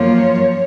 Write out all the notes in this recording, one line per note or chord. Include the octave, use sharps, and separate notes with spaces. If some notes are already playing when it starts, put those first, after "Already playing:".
Already playing: F#2 F3 A#3 F4 C#5